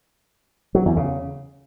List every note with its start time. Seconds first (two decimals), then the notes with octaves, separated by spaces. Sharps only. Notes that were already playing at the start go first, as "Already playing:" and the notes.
0.75 F#3
0.86 E2
0.97 C#3